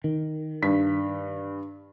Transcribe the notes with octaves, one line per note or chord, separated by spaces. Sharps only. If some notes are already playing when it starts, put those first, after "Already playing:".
D#3
G2 B6